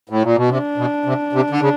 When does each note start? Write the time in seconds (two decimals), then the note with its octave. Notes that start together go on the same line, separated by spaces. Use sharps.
0.09 A2
0.23 A#2
0.36 B2
0.50 C3 D4
0.77 B2
1.05 C3
1.33 C3
1.50 D3
1.61 C#3